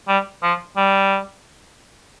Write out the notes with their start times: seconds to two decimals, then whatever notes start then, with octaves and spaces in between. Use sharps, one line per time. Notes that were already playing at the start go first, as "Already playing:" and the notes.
0.08 G3
0.43 F3
0.77 G3